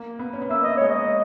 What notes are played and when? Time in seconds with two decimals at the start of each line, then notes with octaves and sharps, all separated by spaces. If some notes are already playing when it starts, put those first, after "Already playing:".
Already playing: A#3
0.19 B3
0.33 C#4
0.42 B3
0.50 A#3 E5
0.64 D#5
0.77 G#3 C#5
0.90 D#5